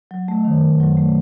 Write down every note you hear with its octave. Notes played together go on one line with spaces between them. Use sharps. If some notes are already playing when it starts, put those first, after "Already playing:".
F#3
A3
D#3
F#2
F#3
A3